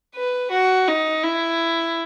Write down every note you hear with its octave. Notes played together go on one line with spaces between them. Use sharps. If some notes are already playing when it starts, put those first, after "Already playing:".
B4
F#4
D#4
E4